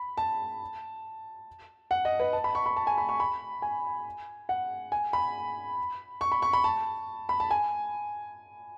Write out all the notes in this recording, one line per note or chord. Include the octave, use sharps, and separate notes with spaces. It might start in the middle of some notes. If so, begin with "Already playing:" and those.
Already playing: B5
A5
F#5
D#5
B4
A5
B5
C#6
B5
A5
G#5
B5
C#6
B5
G#5
F#5
G#5
B5
C#6
B5
C#6
B5
A5
B5
A5
G#5